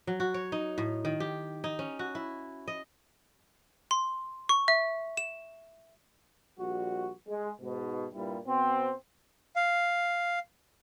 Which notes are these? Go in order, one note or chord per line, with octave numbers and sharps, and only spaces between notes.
F#3
F#4
C#5
D#4
A2
D#3
G4
D#4
C#4
F#4
E4
D#5
C6
C#6
E5
E7
A#1 G3 F#4
G#3
G#2 B2
G2 A#2 G3 E4
B2 B3 C4
F5